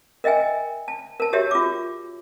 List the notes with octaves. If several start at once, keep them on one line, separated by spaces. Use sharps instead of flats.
A#4 D#5 E5 G5 G#5
A5
A#4 A5
F#4 G4 A#4 C#5 E5
F4 D6